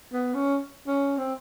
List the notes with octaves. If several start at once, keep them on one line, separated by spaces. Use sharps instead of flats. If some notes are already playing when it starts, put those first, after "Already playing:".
B3
C#4
C#4
C4